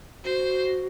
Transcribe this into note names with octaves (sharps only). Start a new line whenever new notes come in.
F#4 C5